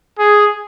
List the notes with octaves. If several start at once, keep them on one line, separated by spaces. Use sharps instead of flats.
G#4